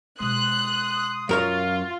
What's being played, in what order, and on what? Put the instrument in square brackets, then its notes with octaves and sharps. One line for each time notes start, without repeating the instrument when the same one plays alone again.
[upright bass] B2 G#3 [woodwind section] C6 D#6 [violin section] F#6
[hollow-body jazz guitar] F#2 A#4 C#5 [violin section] F4